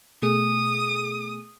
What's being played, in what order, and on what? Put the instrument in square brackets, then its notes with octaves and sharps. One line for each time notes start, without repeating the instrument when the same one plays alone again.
[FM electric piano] B2 A3 G#4 [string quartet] D#6